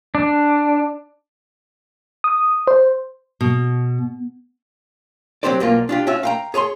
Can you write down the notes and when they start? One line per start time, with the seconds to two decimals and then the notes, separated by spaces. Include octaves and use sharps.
0.15 D4
2.24 D#6
2.67 C5
3.41 B2
5.43 F#3 C4 F4 G4 C5 D5
5.60 B1 A#2 A#3 F4
5.89 D4 F4 G4
6.07 C#4 F4 F#4 E5
6.23 F5 G5 A#5
6.54 G#4 C#5 A#5 C6